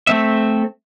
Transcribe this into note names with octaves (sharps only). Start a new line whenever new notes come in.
A3 C4 E5